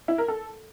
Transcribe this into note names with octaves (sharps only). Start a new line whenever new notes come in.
E4
A#4
A4